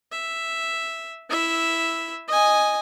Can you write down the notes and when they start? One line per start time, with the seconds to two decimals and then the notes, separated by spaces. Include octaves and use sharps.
0.12 E5
1.30 E4 E5
2.28 D#5 G#5